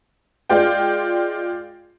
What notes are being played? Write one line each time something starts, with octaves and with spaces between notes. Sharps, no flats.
G#3 F4 D5 G5